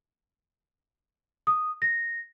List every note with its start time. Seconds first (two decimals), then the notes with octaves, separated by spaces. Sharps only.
1.47 D#6
1.82 A#6